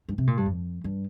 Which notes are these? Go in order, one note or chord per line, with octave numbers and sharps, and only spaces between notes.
G2
C3
A#2
G2
F2
G2